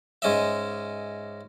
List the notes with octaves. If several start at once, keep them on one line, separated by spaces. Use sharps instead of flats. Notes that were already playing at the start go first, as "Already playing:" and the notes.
G#2 C#4 D#5 E5